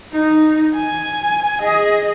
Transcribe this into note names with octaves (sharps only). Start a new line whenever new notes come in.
D#4
G#5
G#4 D#5